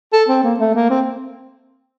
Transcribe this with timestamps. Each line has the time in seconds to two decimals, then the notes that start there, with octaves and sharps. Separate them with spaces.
0.13 A4
0.28 C4
0.43 A#3
0.60 A3
0.75 A#3
0.90 C4